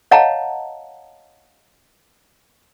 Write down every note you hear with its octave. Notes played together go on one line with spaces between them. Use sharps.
C#5 D#5 F5 F#5 A5 A#5